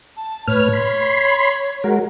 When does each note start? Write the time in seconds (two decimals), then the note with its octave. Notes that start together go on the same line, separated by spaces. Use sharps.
0.17 A5
0.47 A2 B4 C#5 F6
0.73 B5 C6
1.84 G#3 F#4 A#4